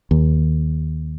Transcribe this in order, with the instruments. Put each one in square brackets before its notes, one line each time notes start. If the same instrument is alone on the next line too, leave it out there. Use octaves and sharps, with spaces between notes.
[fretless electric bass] D#2